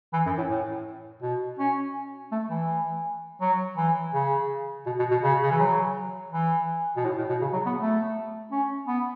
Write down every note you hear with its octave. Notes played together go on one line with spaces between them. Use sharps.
E3
F#2
A2
A2
B2
C#4
A3
E3
F#3
E3
C#3
B2
B2
B2
C#3
C#3
E3
F#3
E3
B2
A2
A2
B2
C#3
F#3
B3
A3
C#4
B3